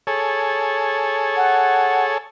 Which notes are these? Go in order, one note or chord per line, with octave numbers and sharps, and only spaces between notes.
G#4 A4 C#5
F#5